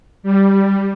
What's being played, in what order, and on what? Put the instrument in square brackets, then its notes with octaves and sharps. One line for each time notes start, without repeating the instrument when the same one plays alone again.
[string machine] G3